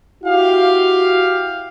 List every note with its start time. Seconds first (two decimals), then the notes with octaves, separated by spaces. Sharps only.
0.24 E4 F#4 G4 F5